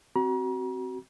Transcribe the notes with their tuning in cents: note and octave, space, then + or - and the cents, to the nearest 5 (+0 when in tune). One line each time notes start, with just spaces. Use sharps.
C4 +0 F#4 +25 A#5 +40